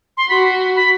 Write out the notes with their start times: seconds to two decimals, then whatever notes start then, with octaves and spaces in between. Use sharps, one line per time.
0.17 C6
0.29 F#4 B5
0.76 B5